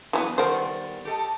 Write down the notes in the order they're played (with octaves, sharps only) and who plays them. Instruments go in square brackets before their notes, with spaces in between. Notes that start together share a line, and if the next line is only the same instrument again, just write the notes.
[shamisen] E3 G3 B3 [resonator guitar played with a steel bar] F#3
[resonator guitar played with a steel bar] D#3 G3 B3 [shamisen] A#4 C5
[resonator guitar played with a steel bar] G4 A4 D#5